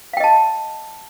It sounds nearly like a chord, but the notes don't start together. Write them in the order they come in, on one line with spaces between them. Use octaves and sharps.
F5 G5 D#5 A5